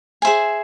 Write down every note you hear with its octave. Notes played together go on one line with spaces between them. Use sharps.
G#4 C5 E5 G#5